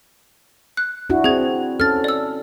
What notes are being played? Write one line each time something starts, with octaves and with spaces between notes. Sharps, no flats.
F#6
D4 E4 F#4
C4 G#4 G#6
C#4 A4 F6 A6
D5 E6